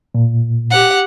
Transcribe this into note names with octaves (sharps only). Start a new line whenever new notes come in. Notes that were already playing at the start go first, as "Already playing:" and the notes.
A#2
G4 F#5